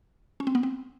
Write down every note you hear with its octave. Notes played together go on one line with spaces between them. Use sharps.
C#4
C4
B3
C4